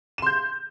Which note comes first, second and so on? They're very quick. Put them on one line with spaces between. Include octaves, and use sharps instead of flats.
E7 C6 G6